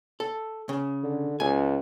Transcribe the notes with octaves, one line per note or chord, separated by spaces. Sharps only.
A4
C#3
D3
C#2 G#5